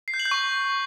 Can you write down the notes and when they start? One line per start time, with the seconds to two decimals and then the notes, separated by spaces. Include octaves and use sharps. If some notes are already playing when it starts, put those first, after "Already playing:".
0.08 C7
0.14 G6
0.20 F#7
0.25 G6
0.31 C#6